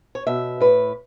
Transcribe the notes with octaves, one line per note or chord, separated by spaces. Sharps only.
C#5
B2 E5
A2 B4